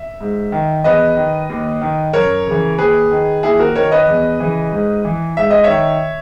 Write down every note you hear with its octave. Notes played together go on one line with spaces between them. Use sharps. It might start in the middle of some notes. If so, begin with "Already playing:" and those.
Already playing: E5
G#2
D#3
E2 B4 D#5
D#3
D#2
D#3
F#2 A#4 C#5
C#3 E3
D#2 G#4 B4
D#3
D#2 E4 G#4
F#4 A#4
D#3 A#4 C#5
B4 D#5
E2
C#3 E3
G#2
E3
G#2 E5
D#5
C#5 E5
D#3